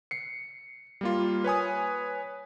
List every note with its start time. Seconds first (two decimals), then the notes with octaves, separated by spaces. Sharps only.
0.11 C7 C#7
1.01 G3 A#3 F4
1.44 B4 C#5 G#5 D#6